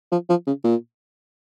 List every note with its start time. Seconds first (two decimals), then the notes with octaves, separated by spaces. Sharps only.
0.12 F3
0.29 F3
0.47 C#3
0.64 A#2